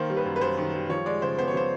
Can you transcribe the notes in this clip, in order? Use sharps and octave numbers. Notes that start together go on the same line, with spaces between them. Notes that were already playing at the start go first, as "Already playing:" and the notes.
Already playing: D#3 A#3 C5
G3
B4
F#2
B4
F#2 C5
D#3
G3
F3 C#5
G#3 D5
C#3 C5
B3 C5
C#5
F3 C5